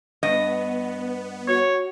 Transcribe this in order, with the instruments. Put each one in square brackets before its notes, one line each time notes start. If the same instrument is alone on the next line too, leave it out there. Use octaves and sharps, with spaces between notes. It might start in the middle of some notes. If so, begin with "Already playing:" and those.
[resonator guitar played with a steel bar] G2 D#5 [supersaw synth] B3
[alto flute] F#4 [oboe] C#5